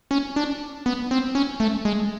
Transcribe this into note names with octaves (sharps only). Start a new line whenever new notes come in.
C#4
D4
B3
C4
C#4
A3
G#3